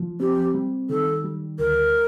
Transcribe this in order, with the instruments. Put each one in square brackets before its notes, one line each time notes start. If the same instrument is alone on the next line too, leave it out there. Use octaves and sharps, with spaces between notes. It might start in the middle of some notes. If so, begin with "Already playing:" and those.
Already playing: [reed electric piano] F3
[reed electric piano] C4 [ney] G4
[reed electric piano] G3
[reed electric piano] D#3 [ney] A4
[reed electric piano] G3
[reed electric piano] D2 [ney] A#4